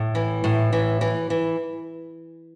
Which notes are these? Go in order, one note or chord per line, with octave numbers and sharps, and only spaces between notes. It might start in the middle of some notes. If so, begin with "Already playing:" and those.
Already playing: A2
E3
A2
E3
E3
E3